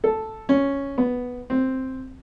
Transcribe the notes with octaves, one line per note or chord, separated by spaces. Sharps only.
A4
C#4
B3
C4